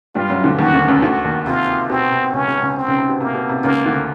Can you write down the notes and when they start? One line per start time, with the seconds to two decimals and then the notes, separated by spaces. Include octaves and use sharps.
0.15 G2 G3 F4
0.30 F#2 F#3
0.44 D2 D3
0.59 D#2 D#3 F#4
0.74 D2 D3
0.88 C#2 C#3
1.02 D2 D3 F#4
1.25 D#2 D#3
1.46 C3 F4
1.90 B2 C4
2.12 C3
2.33 C#2 C#3 C#4
2.48 C#2 C#3
2.62 C#2 C#3
2.77 C4
2.88 C#2 C#3
2.98 C3
3.09 B2
3.20 C3 A#3
3.35 B2
3.49 C3
3.64 C#2 C#3 A#3
3.85 D2 D3